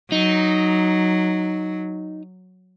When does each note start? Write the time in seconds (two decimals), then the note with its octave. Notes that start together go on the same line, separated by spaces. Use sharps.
0.12 F#3 D#4